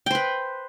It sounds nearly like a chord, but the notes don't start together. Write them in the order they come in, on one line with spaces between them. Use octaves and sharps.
G5 C5 B4